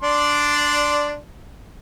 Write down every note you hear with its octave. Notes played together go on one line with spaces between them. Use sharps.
D4 D5 C6